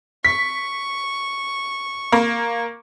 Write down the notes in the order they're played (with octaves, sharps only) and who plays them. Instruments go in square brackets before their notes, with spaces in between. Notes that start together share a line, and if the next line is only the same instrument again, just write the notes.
[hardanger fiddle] C#6 [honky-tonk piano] B6
[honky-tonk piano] A#3